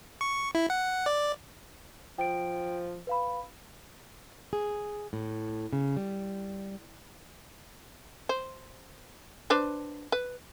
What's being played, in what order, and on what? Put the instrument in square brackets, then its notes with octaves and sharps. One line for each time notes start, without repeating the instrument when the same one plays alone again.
[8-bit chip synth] C#6
E4
F#5
D5
[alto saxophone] F3 [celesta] G5 D7
[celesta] B4 F5 B5
[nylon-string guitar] G#4
A2
C#3
G3
[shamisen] C5
D4 B4 C5
B4